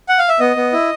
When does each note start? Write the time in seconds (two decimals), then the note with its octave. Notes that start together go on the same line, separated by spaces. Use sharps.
0.09 F#5
0.19 F5
0.29 E5
0.39 B3 D#5
0.56 B3
0.73 E4